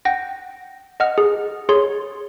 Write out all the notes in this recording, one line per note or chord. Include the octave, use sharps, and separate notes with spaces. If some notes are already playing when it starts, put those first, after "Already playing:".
F#5 G5 A#6
D#5 F#5 F6
G#4
G#4 C#5 C6